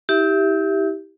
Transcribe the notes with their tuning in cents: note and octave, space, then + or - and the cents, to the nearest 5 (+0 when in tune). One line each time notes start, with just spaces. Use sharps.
E4 -40 G4 +0 E5 +0